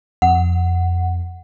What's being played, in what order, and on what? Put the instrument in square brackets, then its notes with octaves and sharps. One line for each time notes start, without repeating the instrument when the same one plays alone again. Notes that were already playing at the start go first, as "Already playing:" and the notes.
[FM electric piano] F2 [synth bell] F#5